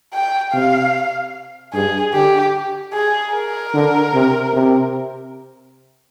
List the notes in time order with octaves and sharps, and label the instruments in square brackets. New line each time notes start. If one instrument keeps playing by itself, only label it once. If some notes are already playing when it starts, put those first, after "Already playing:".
[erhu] G5
[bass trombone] C3 [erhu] F5
[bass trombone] G2 [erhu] G#4
[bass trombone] D3 [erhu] G4
[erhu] G#4
A#4
[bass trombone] D3
C3
C3